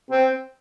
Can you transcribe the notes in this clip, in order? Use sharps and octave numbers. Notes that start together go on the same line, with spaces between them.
C4